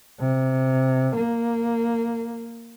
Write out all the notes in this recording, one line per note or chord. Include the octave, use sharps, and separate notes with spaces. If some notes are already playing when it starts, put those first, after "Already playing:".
C3
A#3